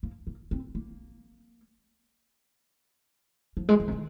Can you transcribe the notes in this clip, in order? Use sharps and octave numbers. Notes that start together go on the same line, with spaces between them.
A#3
A#3
C4
A#3
F3
G#3
F3
C3
D#3